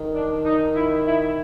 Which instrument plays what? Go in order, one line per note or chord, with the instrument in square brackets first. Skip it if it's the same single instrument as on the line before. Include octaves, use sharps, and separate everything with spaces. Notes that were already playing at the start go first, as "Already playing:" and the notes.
Already playing: [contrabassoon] D#3
[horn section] D4
D#4
E4
E4